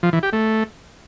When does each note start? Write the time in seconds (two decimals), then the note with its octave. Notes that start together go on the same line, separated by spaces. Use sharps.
0.03 F3
0.13 E3
0.23 G4
0.33 A3